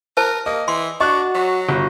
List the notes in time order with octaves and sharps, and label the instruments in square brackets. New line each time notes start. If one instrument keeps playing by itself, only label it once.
[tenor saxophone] A#4 [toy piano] C5 A5
[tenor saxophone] A#3 [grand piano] D#5
[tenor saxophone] E3 [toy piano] C6
[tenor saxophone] D4 [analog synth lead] F#4 [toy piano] D#5 [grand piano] C#6 F#6
[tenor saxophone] F#3
[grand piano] G1 [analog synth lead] F#4